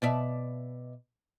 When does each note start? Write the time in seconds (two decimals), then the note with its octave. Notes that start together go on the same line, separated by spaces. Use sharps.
0.02 B2 D5 E5